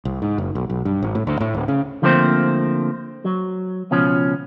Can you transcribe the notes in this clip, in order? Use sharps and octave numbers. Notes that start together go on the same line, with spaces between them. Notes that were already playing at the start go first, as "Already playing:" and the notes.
C2
G#2
F#1
B1
B1
G2
G#1
A2
D2
A2
D1
C#3
D3 F3 A3 A#3 C4 C5
F#3
C#2 B2 F3 C#4